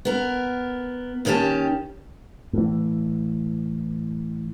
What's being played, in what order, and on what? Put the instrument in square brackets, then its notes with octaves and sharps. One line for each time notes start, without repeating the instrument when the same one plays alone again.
[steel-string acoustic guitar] B3 A#4
D#2 D#3 C#4 G4 A5
[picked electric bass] A2 E3